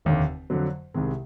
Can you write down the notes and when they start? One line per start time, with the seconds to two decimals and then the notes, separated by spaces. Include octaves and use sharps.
0.05 F1 D#2 D3
0.50 F2 D3 F#3
0.94 C2 C3 D#3 G#3